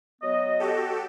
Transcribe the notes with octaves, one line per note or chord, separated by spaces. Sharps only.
F#3 B3 D#5
F#4 G4 A4